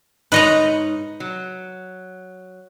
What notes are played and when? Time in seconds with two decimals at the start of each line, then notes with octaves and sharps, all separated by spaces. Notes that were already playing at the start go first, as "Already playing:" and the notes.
0.32 G#2 D#4 B4 C#5 D#5 A#5
1.20 F#3